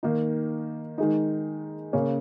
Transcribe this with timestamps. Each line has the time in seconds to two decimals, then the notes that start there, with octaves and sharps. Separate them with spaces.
0.03 D#3 A#3 D#4
0.98 D#3 G#3 D#4
1.93 C#3 A#3 C#4